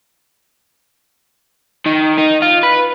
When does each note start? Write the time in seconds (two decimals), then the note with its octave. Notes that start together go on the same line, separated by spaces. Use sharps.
1.86 D#3
2.18 D#4
2.42 F4
2.63 B4